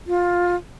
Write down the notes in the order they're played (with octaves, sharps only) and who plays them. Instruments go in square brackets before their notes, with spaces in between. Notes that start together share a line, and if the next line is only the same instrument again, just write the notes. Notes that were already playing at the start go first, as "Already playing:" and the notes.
[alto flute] F4